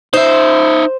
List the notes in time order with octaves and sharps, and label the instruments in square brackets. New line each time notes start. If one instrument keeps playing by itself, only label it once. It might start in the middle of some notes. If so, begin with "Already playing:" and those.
[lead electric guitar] D#4 E5 [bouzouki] C5